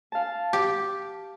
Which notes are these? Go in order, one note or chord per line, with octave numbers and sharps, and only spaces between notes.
F5 A5
G4